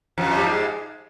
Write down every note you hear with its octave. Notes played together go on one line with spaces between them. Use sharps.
F2 F3
G3
G#2 G#3